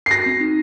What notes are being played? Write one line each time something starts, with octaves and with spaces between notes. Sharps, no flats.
C7
F#4 A#6
C4
D#4